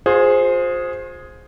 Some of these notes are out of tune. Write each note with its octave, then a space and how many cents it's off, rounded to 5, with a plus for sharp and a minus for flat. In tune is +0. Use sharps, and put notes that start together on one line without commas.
F4 +40 G#4 +0 C5 +0